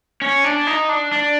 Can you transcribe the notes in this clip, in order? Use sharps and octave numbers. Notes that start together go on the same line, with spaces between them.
C#4
D4
D#4
D4
D4